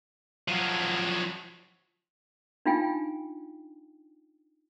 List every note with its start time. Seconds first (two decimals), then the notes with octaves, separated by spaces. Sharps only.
0.48 F3 F#3
2.66 D4 D#4 F4 F5 G5 G#5